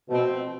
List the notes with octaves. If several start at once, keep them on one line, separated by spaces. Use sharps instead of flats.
B2 F3 A3 C4